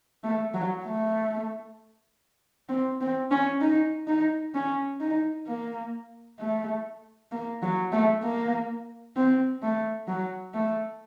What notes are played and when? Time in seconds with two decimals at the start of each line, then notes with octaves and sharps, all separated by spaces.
0.24 A3
0.54 F#3
0.85 A3
2.69 C4
3.01 C4
3.31 C#4
3.61 D#4
4.07 D#4
4.54 C#4
5.00 D#4
5.47 A#3
6.39 A3
7.32 A#3
7.62 F#3
7.92 A3
8.23 A#3
9.16 C4
9.63 A3
10.08 F#3
10.54 A3